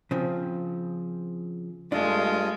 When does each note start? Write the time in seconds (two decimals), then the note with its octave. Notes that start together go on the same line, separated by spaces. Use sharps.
0.11 C#3 F3 C4
1.92 G2 G#3 A3 D4 F4